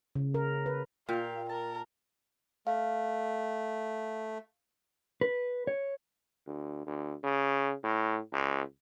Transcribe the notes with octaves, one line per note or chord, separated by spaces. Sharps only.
C#3
A#4
B4
A#2 G4 A#4 F5
A#4 A5
A3 F5
B4
C#5
D2
D2
C#3
A2
C#2